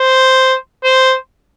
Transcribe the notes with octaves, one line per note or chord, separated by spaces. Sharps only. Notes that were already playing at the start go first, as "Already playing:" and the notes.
Already playing: C5
C5